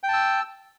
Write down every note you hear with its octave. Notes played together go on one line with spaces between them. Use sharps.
G5 A5 E6